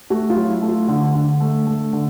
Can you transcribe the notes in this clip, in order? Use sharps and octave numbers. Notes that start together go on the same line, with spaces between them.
A3 F#4
F4
F#3
E4
A3
F4
D3
D3
A3
A3
D3